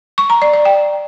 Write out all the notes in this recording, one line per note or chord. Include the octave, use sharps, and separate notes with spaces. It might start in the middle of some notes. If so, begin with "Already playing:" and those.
C#6
A#5
D5
D5
G5